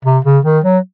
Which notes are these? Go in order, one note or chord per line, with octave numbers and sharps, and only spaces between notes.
C3
C#3
D#3
F#3